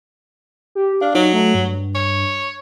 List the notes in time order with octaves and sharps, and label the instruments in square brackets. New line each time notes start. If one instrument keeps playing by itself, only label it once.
[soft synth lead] G4
[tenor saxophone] D4 [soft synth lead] F5
[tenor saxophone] F#3 [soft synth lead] D#4
[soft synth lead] A3
G2
[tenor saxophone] C#5